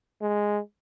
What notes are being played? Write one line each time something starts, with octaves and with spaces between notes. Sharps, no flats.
G#3